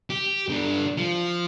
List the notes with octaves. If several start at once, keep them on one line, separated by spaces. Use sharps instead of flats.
G4
G2 D3
F3